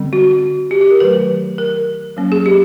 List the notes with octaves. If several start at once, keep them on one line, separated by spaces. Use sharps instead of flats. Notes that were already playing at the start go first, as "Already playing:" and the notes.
Already playing: D3 G3 C4
F#4
G4
G4
A#4
D#3 F#3 A3 B4
A#4
F#3 A#3 C#4
G#4
G4